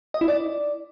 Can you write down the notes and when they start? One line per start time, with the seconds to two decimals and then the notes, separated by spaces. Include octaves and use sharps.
0.14 D#5
0.21 E4
0.28 D5